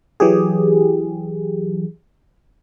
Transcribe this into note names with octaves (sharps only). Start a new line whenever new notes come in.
E3 F#3 G4 G#4